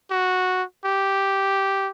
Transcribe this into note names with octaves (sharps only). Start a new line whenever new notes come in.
F#4
G4